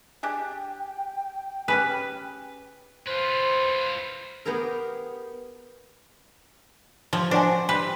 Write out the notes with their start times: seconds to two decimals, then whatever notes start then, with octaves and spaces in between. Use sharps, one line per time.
0.23 D4 G4 G#4 G5
1.68 C#4 G4 G#4 B4
3.07 F4 B4 C5
4.45 B3 G4 G#4 A#4
7.13 F3 G4 C#5
7.31 C#4 D4 F#4 C5
7.69 G3 C4 B4